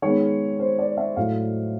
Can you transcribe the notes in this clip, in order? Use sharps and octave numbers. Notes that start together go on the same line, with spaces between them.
D#3 G#3 B3 C#5
C5
D5
E5
A2 F#3 A3 F5